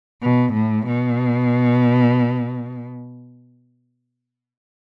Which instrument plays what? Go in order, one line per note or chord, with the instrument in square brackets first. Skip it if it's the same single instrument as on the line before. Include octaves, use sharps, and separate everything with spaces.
[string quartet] B2
A2
B2